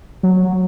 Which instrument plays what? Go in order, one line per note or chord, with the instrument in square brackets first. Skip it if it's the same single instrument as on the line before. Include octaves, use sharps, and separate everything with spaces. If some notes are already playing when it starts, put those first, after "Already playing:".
[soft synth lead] F#3